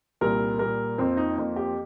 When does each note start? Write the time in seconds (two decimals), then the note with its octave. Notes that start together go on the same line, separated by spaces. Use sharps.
0.21 C2 A#2 G3 A#4
0.59 A#2 G3 A#3 A#4
0.98 F2 F3 A#3 C4
1.17 D#4
1.36 F2 F3 A#3
1.56 G4